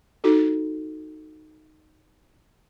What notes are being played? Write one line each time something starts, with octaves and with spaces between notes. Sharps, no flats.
D#4 F#4 A4